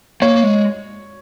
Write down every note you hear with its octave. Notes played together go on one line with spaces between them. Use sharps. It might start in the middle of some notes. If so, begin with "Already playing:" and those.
A#3 C#5
G#3